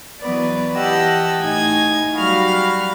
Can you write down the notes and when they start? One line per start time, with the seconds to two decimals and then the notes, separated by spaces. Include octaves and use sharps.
0.22 E3 F#3 B3 B4 D5
0.76 E3 G4 D#5 F#5 A5 E6
1.43 A2 D#4 G#5 G#6
2.16 F#3 G3 F#4 F5 B5 F6